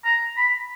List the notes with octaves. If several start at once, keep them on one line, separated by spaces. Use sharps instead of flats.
A#5
B5